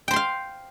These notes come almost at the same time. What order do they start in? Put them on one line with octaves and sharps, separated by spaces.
G5 C5 C6 F5